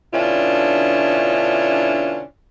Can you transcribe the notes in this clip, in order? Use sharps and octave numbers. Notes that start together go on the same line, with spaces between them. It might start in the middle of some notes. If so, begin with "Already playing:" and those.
B2 D3 C#4 D4 E4 F4